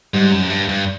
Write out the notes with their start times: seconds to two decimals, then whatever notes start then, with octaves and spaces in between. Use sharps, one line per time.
0.14 G#2 G3
0.32 F#2
0.50 G2
0.69 G2